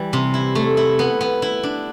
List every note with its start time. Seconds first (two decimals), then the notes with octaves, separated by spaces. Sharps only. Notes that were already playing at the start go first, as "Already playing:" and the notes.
Already playing: E3 G3
0.13 C3
0.34 E4
0.55 A3
0.77 E4
0.99 B3
1.21 B3
1.42 E4
1.63 D4